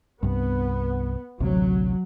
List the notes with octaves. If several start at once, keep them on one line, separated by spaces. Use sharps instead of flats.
C2 G2 B3
A1 D2 C3 F#3